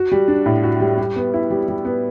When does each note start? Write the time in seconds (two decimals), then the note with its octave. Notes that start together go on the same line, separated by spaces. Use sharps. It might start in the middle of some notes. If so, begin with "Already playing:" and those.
Already playing: F#4
0.12 G3
0.28 D4
0.46 A2
0.63 F#4
0.80 G3
0.98 G3
1.16 B3
1.34 E4
1.51 G3
1.68 G3
1.85 B3